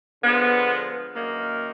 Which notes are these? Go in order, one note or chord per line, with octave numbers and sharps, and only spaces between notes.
D3 F3 G#3 B3
F#2 D#3 A#3